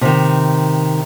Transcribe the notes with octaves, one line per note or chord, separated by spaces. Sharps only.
C3 D#3